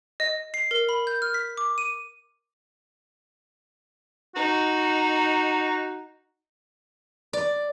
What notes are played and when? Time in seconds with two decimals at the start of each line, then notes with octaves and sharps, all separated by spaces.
0.20 D#5
0.54 C7
0.71 A#4
0.89 B5
1.07 G6
1.22 F6
1.34 B6
1.57 D6
1.78 D#7
4.36 D#4 F#4
7.33 D5